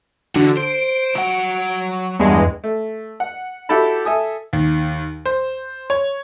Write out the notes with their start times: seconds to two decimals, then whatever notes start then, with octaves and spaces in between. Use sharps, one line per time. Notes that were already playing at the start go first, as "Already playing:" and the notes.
0.36 D3 E3 F#4
0.57 C5 D7
1.15 F#3 F#5
2.19 E2 G2 G#3
2.64 A3
3.20 F#5
3.69 E4 F#4 G4 A4 A5 B5
4.05 A4 E5 G#5 D#6
4.53 D#2
5.26 C5
5.90 C#5